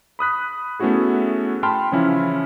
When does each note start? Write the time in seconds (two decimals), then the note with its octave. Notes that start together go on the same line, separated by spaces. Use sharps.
0.19 B5 D#6 F#6 B6
0.80 A3 B3 C#4 E4 F#4 G#4
1.63 G5 A5 B5 C6 F6
1.92 C#3 E3 F3 C#4 E4